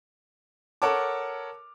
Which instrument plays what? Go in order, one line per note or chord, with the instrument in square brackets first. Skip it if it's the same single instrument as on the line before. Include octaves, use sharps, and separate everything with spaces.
[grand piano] A4 A#4 C#5 F#5 A5 D6